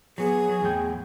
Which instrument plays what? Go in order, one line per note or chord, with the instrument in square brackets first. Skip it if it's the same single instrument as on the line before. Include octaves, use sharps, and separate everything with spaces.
[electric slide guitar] F#3 B3 [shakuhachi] G#4
[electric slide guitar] F#3
E2 A2 G5